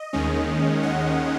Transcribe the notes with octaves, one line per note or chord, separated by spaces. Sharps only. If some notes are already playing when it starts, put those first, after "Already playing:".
Already playing: D#5
D#2 D#3 G#3 C#4
F#5